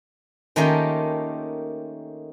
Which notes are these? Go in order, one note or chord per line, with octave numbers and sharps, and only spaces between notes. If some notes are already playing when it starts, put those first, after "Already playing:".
D#3 A3 A#3 C#4 F4 G4